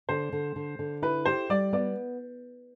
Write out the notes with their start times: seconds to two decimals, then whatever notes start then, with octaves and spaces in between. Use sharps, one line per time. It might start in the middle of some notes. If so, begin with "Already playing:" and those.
0.09 D3 C5
0.32 D3
0.56 D3
0.79 D3
1.02 E4 B4
1.25 G4 C5
1.49 G3 D5
1.73 B3 D5